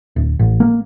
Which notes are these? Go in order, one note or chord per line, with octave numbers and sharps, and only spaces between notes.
D1
A1
A#3